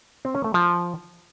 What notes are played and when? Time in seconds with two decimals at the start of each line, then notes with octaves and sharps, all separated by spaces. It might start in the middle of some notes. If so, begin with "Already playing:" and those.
0.25 C4
0.35 C#4
0.44 A3
0.54 F3